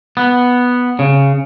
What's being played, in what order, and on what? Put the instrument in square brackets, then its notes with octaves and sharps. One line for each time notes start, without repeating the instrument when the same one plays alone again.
[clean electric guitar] B3
C#3